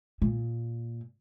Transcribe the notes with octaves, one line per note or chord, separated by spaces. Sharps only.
A#2